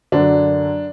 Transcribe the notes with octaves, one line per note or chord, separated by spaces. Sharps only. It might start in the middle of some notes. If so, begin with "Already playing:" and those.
F#2 D3 D4